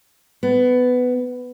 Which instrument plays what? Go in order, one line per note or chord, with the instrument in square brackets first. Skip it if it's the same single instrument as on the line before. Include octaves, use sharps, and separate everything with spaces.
[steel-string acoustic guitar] B3